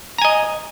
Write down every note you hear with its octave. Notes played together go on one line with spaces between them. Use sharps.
D#5 G#5 A#5